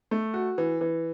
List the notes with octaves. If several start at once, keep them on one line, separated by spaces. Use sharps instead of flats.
A3
F#4
E3
E3